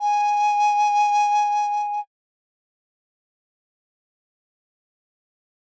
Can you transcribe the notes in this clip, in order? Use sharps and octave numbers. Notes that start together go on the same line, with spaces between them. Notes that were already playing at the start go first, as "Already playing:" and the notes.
G#5